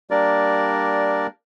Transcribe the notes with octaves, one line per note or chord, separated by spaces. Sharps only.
G3 A#3 D4 A#4 D5